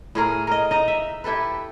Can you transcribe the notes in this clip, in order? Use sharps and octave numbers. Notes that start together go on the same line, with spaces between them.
A2 G#4 A#4
A#4 D#5
D#4 D#5
E5
E4 G4 A4 B4